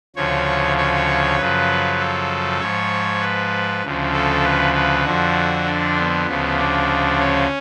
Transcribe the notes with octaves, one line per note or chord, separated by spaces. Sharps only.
D2 C#3 F3 C#5
C#5
F#2 C#3 F3 B4
A4
G#2 F3 C#5
B4
D2 C#3 F3
A4
B4
B4
F2 D3 F3 F#4
D4
B3
D2 C#3 F3
D4
C#4